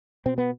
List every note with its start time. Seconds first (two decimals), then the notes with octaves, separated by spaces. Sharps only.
0.26 B2 C4
0.38 B3